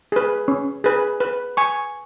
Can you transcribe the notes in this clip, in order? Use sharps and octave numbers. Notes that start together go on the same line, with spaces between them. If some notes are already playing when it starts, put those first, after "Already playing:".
G#4 B4
C#4
G#4 B4
B4
G#5 C#6